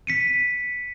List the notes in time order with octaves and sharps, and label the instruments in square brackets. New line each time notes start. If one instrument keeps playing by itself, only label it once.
[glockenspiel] B6 C#7 D#7